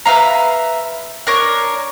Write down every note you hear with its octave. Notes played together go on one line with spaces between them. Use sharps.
B4 E5 F5 A#5
D4 A#4 C#5